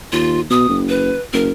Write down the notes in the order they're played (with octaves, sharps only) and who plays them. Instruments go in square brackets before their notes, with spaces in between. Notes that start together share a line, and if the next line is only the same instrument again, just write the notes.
[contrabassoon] D#2 [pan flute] F4
[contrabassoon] B2 [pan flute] D#6
[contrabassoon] F#1
[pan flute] B4
[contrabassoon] F#1 [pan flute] A#4